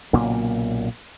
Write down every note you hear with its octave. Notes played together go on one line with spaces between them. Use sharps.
B1 A#2 C#3 A#3